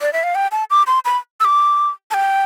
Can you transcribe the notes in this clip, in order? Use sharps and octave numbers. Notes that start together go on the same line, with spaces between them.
D5
E5
F5
G5
A5
D6
C6
B5
E6
D6
A5
G5